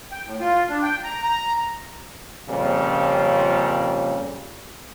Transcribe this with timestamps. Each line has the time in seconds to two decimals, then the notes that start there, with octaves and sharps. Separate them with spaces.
0.12 G5
0.25 A2
0.40 F4
0.69 D4
0.83 G5
1.04 A#5
1.23 A#5
2.48 F2 A#2 C#3 G3 C4 C#4